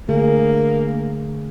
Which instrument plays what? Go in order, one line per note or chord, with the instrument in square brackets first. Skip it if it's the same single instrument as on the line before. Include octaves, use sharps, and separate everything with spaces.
[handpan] D3 A3 G#4 [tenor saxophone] A#3